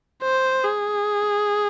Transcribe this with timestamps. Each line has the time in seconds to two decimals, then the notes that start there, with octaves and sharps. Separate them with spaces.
0.23 C5
0.65 G#4